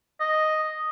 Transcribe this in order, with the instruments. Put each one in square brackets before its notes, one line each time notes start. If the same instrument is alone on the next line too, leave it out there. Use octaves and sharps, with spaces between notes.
[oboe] D#5